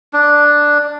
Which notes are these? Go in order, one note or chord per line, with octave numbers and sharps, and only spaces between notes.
D4